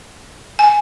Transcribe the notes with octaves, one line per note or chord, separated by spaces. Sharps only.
G#5